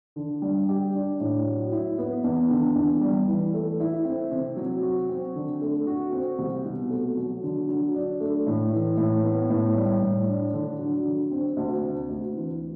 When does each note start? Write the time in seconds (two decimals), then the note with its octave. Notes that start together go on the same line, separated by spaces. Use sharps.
0.16 D3
0.42 G3
0.69 G4
0.95 D4
1.20 A2
1.47 F#3
1.72 E4
1.98 B3
2.24 E2
2.50 D3
2.76 E2
3.01 G3
3.28 E3
3.54 A3
3.80 E4
4.05 C4
4.31 C3
4.57 F#3
4.82 F#4
5.09 C4
5.35 D3
5.61 A3
5.87 F#4
6.12 C4
6.38 C2
6.65 B2
6.90 A3
7.17 F#3
7.43 D3
7.69 F#3
7.95 D4
8.20 A3
8.47 A2
8.73 E3
8.97 A2
9.24 B3
9.50 A2
9.75 G3
10.02 A2
10.28 D4
10.53 D3
10.79 F#3
11.05 D3
11.31 C4
11.57 D2
11.83 C3
12.09 D2
12.35 E3